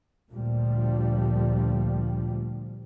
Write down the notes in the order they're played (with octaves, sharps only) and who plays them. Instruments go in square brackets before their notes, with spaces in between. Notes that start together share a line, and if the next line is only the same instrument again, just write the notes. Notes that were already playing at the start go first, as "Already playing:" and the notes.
[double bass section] D2 A#2 F3 G3